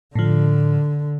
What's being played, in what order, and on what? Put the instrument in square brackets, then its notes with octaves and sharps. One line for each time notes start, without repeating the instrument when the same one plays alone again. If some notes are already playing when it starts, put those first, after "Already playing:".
[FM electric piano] A2 F3 [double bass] D3